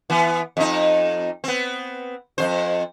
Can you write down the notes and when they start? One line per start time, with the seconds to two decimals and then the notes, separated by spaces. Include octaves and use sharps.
0.10 E3 B3
0.57 F2 D#4
1.44 B3 C4
2.38 F2 C#3 C5